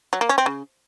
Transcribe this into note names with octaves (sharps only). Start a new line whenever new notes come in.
F#3
A#3
C#4
C4
C#3